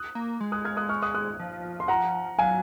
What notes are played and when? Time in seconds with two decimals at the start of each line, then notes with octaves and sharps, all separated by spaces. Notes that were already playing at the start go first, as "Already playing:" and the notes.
Already playing: D#6 F#6
0.15 A#3
0.40 G#3
0.52 D#6 F#6
0.65 F6 G#6
0.77 D#6 F#6
0.89 C#6 F6
1.02 D#6 F#6
1.15 D#6 F#6
1.39 F3
1.80 C6
1.88 F#5 A#5
2.38 F#3 F5 G#5